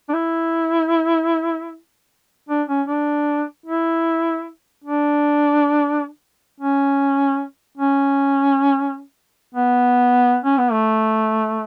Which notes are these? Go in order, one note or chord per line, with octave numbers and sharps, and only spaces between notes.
D4
E4
D4
C#4
D4
E4
D4
C#4
C#4
B3
C#4
B3
A3